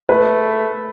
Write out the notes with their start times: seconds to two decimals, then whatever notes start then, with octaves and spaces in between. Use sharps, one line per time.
0.09 A3 B4